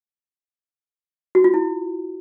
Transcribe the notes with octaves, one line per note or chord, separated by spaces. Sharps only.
F#4
F4
E4